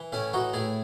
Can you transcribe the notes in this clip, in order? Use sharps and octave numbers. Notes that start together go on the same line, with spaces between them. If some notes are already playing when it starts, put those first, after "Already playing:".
Already playing: E3
A2 C#4 E4
E3 D#4 F#4
A2 E4 G#4